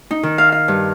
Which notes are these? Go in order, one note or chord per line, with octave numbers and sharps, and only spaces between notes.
D#4
D#3
F5
F5
G2